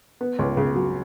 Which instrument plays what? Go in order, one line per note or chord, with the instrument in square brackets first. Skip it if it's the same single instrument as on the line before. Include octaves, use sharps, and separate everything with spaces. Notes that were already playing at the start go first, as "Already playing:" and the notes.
[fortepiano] B3
C#2
C#3
F#3